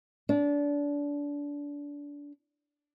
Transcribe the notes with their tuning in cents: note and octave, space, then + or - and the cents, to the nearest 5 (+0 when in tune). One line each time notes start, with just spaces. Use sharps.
D4 -25